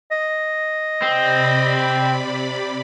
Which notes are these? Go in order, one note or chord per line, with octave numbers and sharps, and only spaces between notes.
D#5
C3 C4 D5 B5